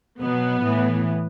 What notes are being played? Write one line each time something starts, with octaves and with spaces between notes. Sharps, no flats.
B2 F#3 B3
A2 E3